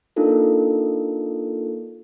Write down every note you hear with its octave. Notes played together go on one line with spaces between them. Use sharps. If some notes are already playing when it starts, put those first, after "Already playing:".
A#3 D4 D#4 F4 A4 A#4